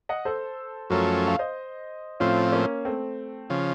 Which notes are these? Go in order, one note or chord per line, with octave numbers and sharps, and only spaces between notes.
D#5 F#5
A4 C5
F#2 F3 A3 C#4 F#4 A#4
F5
C5 D#5
A2 F3 C4 C#4 F4
A#3 C#4
A3 C4
C#3 F3